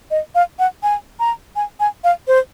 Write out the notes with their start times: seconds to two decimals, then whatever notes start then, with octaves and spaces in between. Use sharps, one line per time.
0.11 D#5
0.35 F5
0.59 F#5
0.83 G#5
1.20 A#5
1.56 G#5
1.80 G#5
2.04 F5
2.28 C5